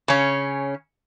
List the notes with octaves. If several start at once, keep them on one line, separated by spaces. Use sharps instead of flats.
C#3 C#4